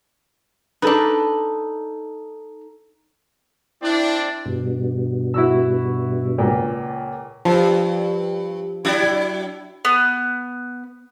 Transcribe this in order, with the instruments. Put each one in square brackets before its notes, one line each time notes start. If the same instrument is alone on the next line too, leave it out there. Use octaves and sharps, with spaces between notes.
[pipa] D4 B4 [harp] D#4 A4
[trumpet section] C4 D4 D5 [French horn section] E4
[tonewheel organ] G2 B2
[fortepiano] E4 F#4 E6
C#2 A#2
[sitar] G2 [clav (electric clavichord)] F3
[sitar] F#3 D4 E4
[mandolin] B3